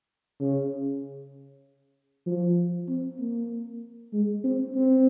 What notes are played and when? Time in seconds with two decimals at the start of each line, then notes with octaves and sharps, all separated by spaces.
0.40 C#3
2.26 F3
2.88 C4
3.19 A#3
4.13 G#3
4.44 C4
4.75 C4